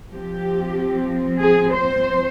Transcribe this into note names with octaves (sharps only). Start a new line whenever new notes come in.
F3 C4 G4
G#4
C5